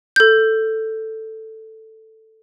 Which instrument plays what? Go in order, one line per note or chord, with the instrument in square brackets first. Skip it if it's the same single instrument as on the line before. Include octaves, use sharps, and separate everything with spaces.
[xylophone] A4 G6